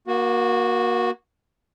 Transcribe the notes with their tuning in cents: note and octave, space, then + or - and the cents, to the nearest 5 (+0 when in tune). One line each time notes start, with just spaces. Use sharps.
A#3 +25 F#4 -10